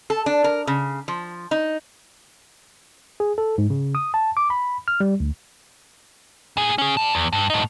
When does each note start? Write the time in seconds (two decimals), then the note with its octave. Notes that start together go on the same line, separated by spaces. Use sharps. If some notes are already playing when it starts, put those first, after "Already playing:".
0.10 A4
0.26 D4
0.44 A#4
0.67 C#3
1.08 F3
1.51 D#4
3.20 G#4
3.38 A4
3.58 G#2
3.70 C#3
3.95 D#6
4.14 A5
4.37 D6
4.50 B5
4.88 F6
5.00 G3
5.20 D2
6.57 A#2 G#4
6.78 C#4 G#4
6.97 G3 A5
7.15 E2
7.33 G2
7.50 A2 D#4